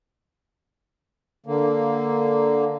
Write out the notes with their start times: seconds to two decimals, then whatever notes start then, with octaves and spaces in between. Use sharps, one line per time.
1.46 D3 A#3